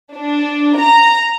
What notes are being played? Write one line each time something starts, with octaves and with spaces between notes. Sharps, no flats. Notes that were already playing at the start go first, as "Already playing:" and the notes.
D4
A#5